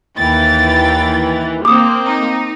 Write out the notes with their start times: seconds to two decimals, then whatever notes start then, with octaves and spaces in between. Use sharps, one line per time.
0.18 D#2 E3 G5 A6
1.65 A#3 C4 D6 D#6
2.06 D#4